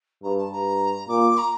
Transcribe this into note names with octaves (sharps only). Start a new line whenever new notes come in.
G2 A#5
A5
G2 A#5
A#2 D6
A#5